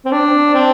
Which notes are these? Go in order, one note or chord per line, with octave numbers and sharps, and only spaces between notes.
C4
D4
C4